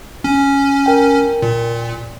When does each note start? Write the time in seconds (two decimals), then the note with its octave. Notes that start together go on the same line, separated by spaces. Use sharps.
0.24 C#4
0.86 A#4 G5
1.42 A#2